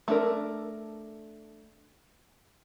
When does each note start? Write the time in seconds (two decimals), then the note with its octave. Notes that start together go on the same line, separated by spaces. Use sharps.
0.08 A3 D4 A#4